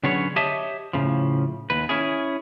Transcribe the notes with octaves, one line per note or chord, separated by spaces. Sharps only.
D3 F#3 B3 C#4 G#4 C#5
G4 C#5 D#5 E5 A5
A2 C#3 F3
D#2 B4
C#4 E4 G#4